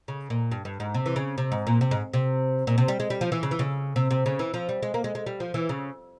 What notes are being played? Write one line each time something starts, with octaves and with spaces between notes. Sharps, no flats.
C#3
A#2
G2
G2
G#2
C3
E3
C#3
C3
G#2
A#2
C3
G#2
C3
A#2
C3
G3
G#3
G3
F3
E3
C#3
E3
C#3
C3
C3
C#3
E3
F3
G3
G#3
A#3
G#3
G#3
G3
F3
E3
C#3